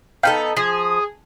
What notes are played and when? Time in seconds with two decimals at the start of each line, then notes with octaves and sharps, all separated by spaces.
0.23 B3 D#4 A4 F5 G5
0.57 F3 G#4